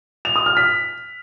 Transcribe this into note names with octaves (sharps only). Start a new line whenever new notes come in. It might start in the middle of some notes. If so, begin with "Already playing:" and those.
F7
D#6
F6
B6